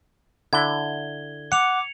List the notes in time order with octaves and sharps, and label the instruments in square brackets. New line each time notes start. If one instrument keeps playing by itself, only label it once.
[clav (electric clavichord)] D3 E4 [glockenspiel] G#6 G7
[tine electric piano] F#5 [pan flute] D6 [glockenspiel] C#7 F7